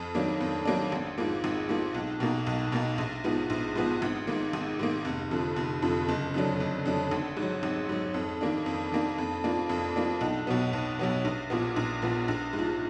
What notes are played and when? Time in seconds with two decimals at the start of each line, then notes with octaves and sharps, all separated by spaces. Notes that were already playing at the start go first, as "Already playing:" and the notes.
Already playing: F2
0.15 D#3 F#3 A#3 D4
0.41 F2
0.65 D#3 F#3 A#3 D4
0.92 G#1
1.18 G#2 F3 A#3
1.44 G#1
1.69 G#2 F3 A#3
1.94 B1
2.20 B2 A#3 D#4
2.47 B1
2.72 B2 A#3 D#4
2.98 A#1
3.24 G#2 F3 B3
3.50 A#1
3.76 G#2 F3 B3
4.02 G#1
4.27 G#2 D#3 A#3
4.53 G#1
4.79 G#2 D#3 A#3
5.05 F1
5.31 F2 D3 F3
5.56 F1
5.82 F2 D3 F3
6.08 F#1
6.34 F2 D3 F#3 D4
6.60 F#1
6.86 F2 D3 F#3 D4
7.11 G#1
7.37 G#2
7.42 F#3
7.63 G#1
7.89 G#2 F#3
8.14 F2
8.41 D#3 A#3 D4
8.66 F2
8.92 D#3 A#3 D4
9.18 F2
9.44 F3 A#3 D4
9.69 F2
9.96 F3 A#3 D4
10.21 B1
10.47 B2 F#3 B3
10.73 B1
10.99 B2 F#3 B3
11.25 A#1
11.50 A#2 F3 B3
11.76 A#1
12.02 A#2 F3 B3
12.28 A#1
12.53 G#2
12.58 F3